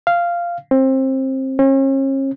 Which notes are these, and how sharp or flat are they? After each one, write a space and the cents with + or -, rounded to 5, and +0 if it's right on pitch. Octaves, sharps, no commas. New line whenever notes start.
F5 -10
C4 +20
C#4 -40